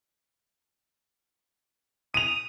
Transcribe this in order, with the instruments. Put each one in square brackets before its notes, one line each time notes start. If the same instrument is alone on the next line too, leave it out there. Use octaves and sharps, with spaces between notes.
[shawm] D#6 [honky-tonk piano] D#7 F7